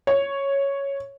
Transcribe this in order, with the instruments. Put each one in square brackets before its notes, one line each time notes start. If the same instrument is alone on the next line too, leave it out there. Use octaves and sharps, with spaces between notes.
[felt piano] C#5